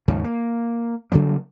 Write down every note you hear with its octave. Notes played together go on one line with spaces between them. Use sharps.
D#2 G#2 C#3 F3
A#3
C#3 F#3 G3 A#3